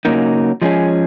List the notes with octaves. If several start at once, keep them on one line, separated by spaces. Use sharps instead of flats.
C#3 F#3 A#3 D#4 A#4
F3 G#3 C#4 G#4